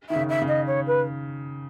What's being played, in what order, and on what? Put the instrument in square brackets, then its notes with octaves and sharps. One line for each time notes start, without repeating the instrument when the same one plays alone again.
[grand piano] D#3 [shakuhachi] E5
[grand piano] C#3
[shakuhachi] E5
[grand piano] C#3
[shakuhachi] D#5
C#5
B4